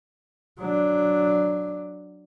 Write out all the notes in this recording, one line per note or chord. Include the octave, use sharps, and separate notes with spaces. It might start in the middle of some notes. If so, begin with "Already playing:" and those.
F#3 D4